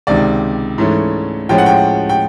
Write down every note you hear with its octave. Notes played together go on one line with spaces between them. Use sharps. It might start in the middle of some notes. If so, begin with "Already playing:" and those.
C#2 C3 D#3 D5
G#2 E3 A3 C#4
A2 F3 G#3 C#4 G5
F#5
G5
G5